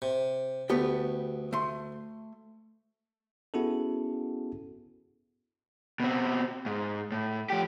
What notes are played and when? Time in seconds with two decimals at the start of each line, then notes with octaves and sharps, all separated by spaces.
0.02 C3
0.70 D2 A3 B3 G4
1.53 A3 C6
3.54 B3 C#4 E4 F#4 G#4 A4
6.00 B2 C4
6.66 G#2
7.12 A2
7.50 F3 G4